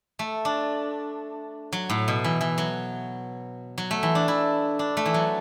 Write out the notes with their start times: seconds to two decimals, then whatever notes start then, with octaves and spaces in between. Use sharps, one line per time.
0.19 A3
0.45 D4
1.73 F#3
1.90 A2
2.08 B2
2.24 E3
2.41 E3
2.58 F#3
3.78 F#3
3.91 A3
4.03 E3
4.15 D4
4.28 E4
4.79 D4
4.97 A3
5.06 E3
5.14 F#3